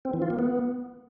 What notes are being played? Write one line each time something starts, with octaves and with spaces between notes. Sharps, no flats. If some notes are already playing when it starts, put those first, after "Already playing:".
C4
E3
F4
A#3
B3